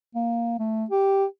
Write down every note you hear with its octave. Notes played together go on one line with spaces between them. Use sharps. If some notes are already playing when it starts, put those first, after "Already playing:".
A#3
A3
G4